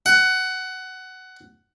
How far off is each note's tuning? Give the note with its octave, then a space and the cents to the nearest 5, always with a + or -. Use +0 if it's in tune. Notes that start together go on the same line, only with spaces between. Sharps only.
F#5 +15